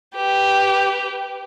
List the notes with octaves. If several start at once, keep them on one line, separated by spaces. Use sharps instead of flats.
G4 B4